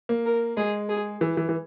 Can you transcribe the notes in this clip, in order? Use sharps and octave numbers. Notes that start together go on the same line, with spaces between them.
A#3
A#4
G#3 G#4
G#4
E3
E3
E3